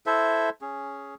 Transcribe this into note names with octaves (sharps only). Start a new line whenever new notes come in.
E4 A4 C5 E5
C#4 G#4